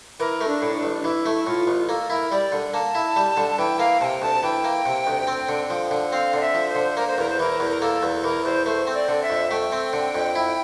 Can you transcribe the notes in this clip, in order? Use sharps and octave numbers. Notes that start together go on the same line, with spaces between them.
E3 A#4
A3
D4
A2
D4
A1
E3 E4
A3
A2 F4
A1
A#3 A4
E4 A#4
G3 D5
D3
A#3 A5
E4
G3
D3
E3 G5
A#3 F5
C3 G5 A5
D2 A5
E3 G5
A#3
C3
D2
C4
D3
F3
D3
C4 F5
D3 D5
E5
F3
C5
D3
A#3 A#4
C5
E2 A#4
C5
E3 A#4
E2
A#4
A#3 A4
E2
E3 A#4
E2 C5
A3 C5
C4
D5
D3
E5
F2
A3 G5
C4
D3
F2
E4